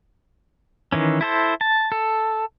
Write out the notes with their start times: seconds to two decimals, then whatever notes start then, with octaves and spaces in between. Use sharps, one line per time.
0.92 D#3 E3 C#4
1.21 E4 A4 C5
1.61 A5
1.92 A4